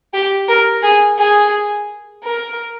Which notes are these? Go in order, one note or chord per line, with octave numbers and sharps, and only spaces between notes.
G4
A#4
G#4
G#4
A#4